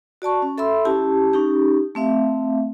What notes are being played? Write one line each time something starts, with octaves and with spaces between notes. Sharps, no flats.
F#4 D5 A5 C#6
C#4
A4 E5 B5 C6 E6
C#4 E4 G4 A5
C#4 D#4 G4
A3 C4 E5 F5